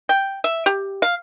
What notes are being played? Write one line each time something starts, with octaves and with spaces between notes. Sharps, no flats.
G5
E5
G4
F5